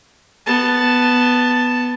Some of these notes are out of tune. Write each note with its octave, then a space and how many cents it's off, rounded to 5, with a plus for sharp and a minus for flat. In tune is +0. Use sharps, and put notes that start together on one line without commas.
B3 +0 A5 +0